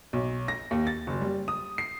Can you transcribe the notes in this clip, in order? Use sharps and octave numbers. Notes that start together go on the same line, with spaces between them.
B1
A#6
D#2
A6
F#1
G3
D#6
C7